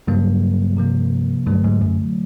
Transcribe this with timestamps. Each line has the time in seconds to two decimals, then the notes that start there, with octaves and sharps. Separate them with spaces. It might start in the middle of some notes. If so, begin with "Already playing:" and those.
0.07 G2 C#3 F#3 A#3
0.77 C3 F3 A#3
1.46 G2 D3 F#3 A3
1.64 G#2
1.81 F#2